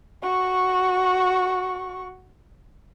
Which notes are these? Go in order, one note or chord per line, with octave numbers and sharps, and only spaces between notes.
F#4 C#6